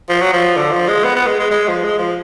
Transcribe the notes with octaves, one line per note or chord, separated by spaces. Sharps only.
F3
F#3
F3
D3
F3
G#3
B3
B3
G#3
G#3
G#3
F3
G#3
F3